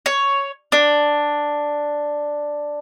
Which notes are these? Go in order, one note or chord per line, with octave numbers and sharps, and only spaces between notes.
C#5
D4